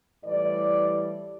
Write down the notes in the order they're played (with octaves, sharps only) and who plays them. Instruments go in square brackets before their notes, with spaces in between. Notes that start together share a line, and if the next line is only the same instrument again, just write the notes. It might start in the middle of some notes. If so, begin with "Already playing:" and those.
[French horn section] A2 E3 G3 D5